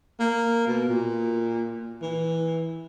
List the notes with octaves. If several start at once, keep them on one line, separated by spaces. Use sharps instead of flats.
A#3
B2
A#2
E3